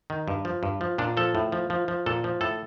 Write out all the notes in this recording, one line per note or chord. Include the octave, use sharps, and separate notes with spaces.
D#3
G2
F3
G2
F3
A#2 D4
F3 A4
A2
F3
F3
F3
A#2 A4
F3
A2 A4